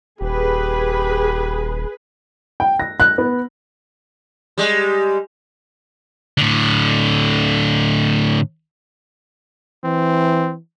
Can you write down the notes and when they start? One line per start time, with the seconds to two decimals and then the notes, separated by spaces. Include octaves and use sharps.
0.21 D#1 G4 G#4 B4
2.60 G5
2.79 A#6
3.00 F#6
3.18 B3
4.58 G3 G#3
6.38 A2 D3
9.84 E3 C4